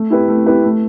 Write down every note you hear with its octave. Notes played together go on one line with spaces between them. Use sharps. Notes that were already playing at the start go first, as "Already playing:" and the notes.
Already playing: A3
E4 G4 B4
A3
E4 G4 B4
A3